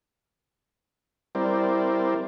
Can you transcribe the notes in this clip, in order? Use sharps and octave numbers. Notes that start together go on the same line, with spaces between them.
G3 C4 E4 A#4 C5 D5